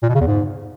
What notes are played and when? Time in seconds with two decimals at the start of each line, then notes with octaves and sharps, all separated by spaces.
0.03 A#2
0.09 B2
0.15 C#3
0.21 E2
0.27 G#2